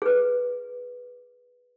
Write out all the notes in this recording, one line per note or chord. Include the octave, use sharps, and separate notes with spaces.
G#4 B4